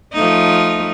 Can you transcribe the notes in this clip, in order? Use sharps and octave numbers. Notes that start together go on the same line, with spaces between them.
F3 A3 D#4